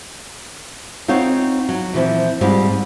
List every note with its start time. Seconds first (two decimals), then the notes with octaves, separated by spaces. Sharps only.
1.08 C4 D#4 F4 C#5 F5 F#5
1.69 F#3
1.93 A#2 E3 F3 C4
2.41 G#2 G3 C4 F4